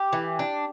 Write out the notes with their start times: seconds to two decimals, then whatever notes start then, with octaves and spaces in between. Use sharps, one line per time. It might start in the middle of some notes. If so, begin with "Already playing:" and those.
Already playing: G4
0.13 E3
0.39 D4